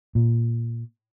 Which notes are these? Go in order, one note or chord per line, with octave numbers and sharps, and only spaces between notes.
A#2